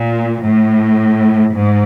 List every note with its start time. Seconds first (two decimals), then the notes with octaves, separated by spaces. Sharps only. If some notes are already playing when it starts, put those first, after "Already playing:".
Already playing: A#2
0.45 A2
1.55 G#2